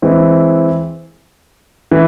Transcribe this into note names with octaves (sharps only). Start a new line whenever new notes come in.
E3 G#3 C4
E3